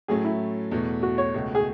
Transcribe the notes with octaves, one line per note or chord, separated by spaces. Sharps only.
A2 F#3 A3 C#4 G#4
E4
E2 B2 A3
F#4
C#5
C#2 B2 A3 C#4 F#4
G#4